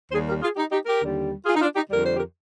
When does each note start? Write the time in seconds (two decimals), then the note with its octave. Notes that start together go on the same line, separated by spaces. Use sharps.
0.12 D#2 D#3 G3 G#4 C5
0.27 G4 A#4
0.42 F4 G#4
0.56 D#4 G4
0.71 D#4 G4
0.86 G4 A#4
1.01 D#2 D3 G3
1.46 F4 G#4
1.55 D#4
1.61 D4 F4
1.75 D#4 G4
1.90 F2 D3 G3 A#4
2.03 C5
2.16 G4 A#4